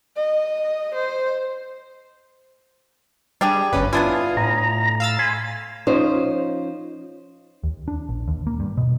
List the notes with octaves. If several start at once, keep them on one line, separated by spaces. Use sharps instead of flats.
D#5
C5
G3 D4 G4 G#4
G1 G2 C#4 B4
B3 D4 E4 F4 G#5 D#6
A2 A#5
F5 E6 A6
G#5 B5 C6
F3 C#4 D#4 C5
D#2
D4
A#1
D#2
A#3
G2
B2